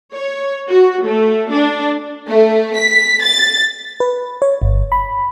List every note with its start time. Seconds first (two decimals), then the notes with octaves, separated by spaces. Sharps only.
0.14 C#5
0.70 F#4
1.05 A3
1.53 D4
2.28 A3
2.76 B6
3.22 A6
4.00 B4
4.42 C#5
4.62 G1
4.92 B5